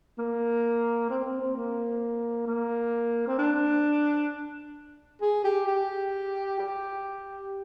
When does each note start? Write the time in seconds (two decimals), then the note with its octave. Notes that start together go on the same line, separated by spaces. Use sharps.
0.18 A#3
1.10 C4
1.24 C4
1.40 C4
1.56 A#3
2.47 A#3
3.28 C4
3.39 D4
5.21 G#4
5.44 G4
5.67 G4
6.59 G4